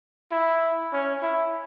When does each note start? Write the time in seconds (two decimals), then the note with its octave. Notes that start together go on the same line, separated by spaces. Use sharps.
0.31 E4
0.92 C#4
1.22 E4